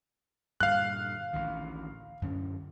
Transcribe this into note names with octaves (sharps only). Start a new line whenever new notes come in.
G2 A#2 D3 F5 F#6
A1 D2 D#3
F#2 D3 C#4